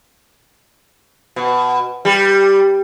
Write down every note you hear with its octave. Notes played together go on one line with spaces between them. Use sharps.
B2
G3